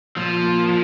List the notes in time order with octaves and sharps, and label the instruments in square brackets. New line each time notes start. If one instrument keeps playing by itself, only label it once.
[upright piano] A#2 [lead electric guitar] F3
[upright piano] A#3
A#2